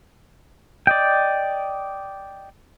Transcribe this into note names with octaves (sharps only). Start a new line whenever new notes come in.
D5 D#5 G5